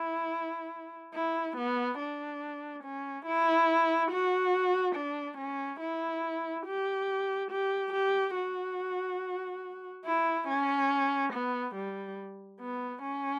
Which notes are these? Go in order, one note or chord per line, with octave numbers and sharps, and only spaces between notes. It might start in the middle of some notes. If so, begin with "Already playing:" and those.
Already playing: E4
E4
B3
D4
C#4
E4
F#4
D4
C#4
E4
G4
G4
G4
F#4
E4
C#4
B3
G3
B3
C#4